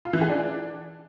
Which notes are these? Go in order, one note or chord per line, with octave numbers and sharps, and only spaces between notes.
F4
E3
G#4
D4